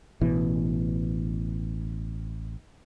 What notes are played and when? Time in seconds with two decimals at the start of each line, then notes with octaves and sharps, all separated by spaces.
0.21 A1 B2 E3